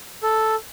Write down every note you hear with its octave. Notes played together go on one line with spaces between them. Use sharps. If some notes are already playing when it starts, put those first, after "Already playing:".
A4